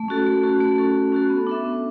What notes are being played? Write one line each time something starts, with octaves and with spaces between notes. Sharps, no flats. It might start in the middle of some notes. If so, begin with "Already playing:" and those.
Already playing: A3
C#4 F#4 A4
A3
C#4 F#4 A4
A3
C#4 F#4 A4
A3
C#4 F#4 A4
B3
D4 A4 E5
B3